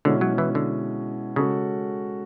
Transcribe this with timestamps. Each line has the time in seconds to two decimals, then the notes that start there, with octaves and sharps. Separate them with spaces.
0.05 B2 D3 G#3 C#4 E4 G#4
0.21 F#3
0.38 E3
0.55 D3
1.36 C#3 G#3 C#4 F#4 A4